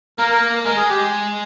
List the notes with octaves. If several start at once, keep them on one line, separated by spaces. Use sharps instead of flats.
A#3 A#4
A#4
A#4
G#3 A#4
G#4
G4